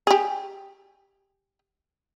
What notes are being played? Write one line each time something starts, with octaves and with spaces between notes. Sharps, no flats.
G4 G#4